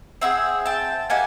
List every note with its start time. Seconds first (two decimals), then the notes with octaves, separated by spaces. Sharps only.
0.21 C4 E4 G#4 E5 F#5
0.66 G5 A5
1.10 A#3 D#4 G4 F#5 G#5